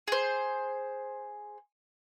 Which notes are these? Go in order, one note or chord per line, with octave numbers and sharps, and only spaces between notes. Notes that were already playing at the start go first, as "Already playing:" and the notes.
G#4 C5